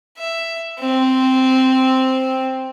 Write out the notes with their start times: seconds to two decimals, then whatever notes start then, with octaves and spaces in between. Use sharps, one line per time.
0.19 E5
0.80 C4